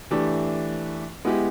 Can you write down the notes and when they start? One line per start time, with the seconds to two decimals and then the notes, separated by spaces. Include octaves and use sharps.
0.11 E3 A3 D4 G4
1.25 G#3 B3 E4 G4